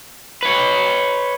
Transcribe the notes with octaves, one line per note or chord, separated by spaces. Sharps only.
B4 C#5